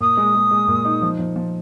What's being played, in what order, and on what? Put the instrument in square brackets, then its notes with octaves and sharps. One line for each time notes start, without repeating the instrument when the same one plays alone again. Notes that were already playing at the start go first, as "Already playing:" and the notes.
[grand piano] A#2 [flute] D#6
[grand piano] G#3
G#3
G#3
A#2
D#4
F3
F3
F3